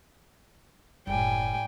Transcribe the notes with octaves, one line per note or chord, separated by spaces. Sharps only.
F#1 A2 G3 G5 G#5